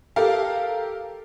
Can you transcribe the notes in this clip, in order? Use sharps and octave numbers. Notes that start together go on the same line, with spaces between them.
G4 A4 A#4 F5